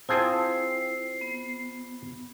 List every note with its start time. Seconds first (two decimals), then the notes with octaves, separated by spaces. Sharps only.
0.09 C4 E4 F4 G#4 G5 A5
0.33 C7
1.21 B3